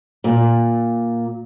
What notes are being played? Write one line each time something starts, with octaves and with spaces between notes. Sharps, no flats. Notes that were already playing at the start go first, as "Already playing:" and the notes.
A#2